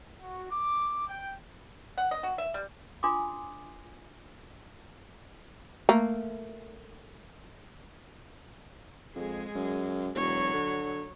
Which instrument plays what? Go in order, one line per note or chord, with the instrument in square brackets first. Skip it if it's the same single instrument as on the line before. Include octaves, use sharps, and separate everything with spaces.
[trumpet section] F#4
D6
G5
[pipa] F#5
D#5
F#4
E5
G3
[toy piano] D4 F4 G#5 C6 D6 D#6
[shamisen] A3 A#3
[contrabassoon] F2 [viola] G#3 G#4
[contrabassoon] F#2
[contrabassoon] E1 [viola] F#3 C#5
[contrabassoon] D3